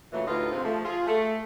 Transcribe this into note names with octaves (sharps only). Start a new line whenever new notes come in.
A#2 C#3 E3 F#3 A3
D2 A2 D#4 F4 G4 B4
G#2 C3 G#3 C4 F4
F3 A3
F4 G#4
A3